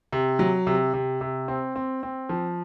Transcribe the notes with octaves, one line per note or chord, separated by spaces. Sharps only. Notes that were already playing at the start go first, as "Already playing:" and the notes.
C3
F#3
C3
C3
C3
C4
C4
C4
F3